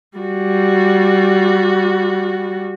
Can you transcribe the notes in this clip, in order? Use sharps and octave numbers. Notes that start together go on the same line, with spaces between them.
G3 F#4